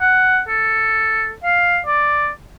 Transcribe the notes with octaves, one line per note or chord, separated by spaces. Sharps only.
F#5
A4
F5
D5